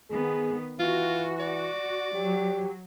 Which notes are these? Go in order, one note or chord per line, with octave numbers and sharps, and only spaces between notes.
D#3 B3 G#4
E3 F4 F#4
D5
F#3 G4